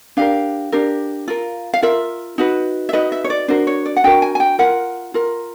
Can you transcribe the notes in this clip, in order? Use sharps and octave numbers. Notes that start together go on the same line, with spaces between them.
D4 G4 A#4 F5
D4 G4 A#4
F4 A#4
F5
F4 A#4 E5
D#4 F#4 B4
E5
D#4 F#4 B4 D#5
E5
C#5
D5
D4 F#4 A#4 C5
C#5
D5
F#5
D4 F#4 A#4 G5
G#5
G#5
G5
F4 A#4 F#5
F4 A#4